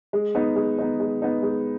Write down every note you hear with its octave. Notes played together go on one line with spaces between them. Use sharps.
G#3
B3 D#4
G#3
B3 D#4
G#3
B3 D#4
G#3